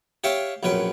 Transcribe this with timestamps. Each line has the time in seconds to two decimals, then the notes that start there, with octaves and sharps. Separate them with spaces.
0.24 G4 C#5 E5 F5 G5
0.63 A#1 F#2 C#4 B4 G5